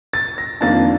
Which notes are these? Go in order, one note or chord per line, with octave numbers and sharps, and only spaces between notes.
A6
A#6
F2 D#3 A#3 D4 A6